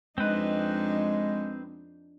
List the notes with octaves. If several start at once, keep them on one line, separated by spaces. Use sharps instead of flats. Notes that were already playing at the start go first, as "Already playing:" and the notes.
F2 G#3 C4 D4 D#4 B4